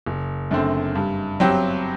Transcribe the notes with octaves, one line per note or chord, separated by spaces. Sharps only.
F#1
F#2 D3 A3 C4
G2
F#3 C4 G4